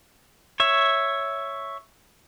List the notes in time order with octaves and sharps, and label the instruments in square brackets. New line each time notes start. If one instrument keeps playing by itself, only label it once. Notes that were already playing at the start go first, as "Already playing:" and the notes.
[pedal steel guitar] C#5 E5